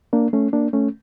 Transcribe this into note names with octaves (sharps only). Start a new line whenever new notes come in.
A#3 D4
A3 C#4
A#3 D4
A3 C#4